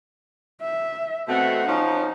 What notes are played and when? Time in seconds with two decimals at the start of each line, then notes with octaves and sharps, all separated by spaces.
0.62 E5
1.28 B2 A3 C4 F#5
1.68 F3 C#4 D#4